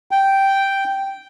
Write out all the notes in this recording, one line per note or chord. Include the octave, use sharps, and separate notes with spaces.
G5